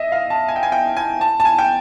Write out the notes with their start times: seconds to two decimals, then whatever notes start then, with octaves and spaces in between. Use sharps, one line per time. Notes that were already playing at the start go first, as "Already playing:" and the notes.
Already playing: D#5 E5
0.12 F5
0.30 A5
0.48 G#5
0.56 G5
0.63 G#5
0.72 G5
0.97 G#5
1.21 A5
1.40 A5
1.45 G#5
1.59 G5